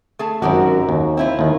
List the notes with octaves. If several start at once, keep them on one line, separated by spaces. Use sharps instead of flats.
A3 G#4 A5
G#1 F#2 F#4 G4 A#4
D#2
C4 E4 F4
D#2 D#3